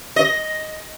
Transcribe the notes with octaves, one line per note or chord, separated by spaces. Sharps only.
D#5